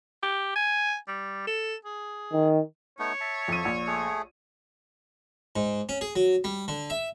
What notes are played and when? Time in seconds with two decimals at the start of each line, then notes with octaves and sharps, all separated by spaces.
0.23 G4
0.56 G#5
1.08 G3
1.47 A4
1.85 G#4
2.32 D#3
2.99 A3 B3 D#4 C#5
3.21 E5 A5
3.48 F2 D#7
3.65 A#1
3.87 A3 G#4
5.56 G#2
5.89 C#4
6.01 G#4
6.16 F#3
6.44 G3
6.68 D3
6.90 E5